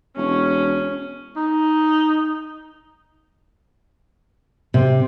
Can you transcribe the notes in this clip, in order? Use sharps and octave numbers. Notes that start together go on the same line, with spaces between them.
E1 C#4
D#4
C3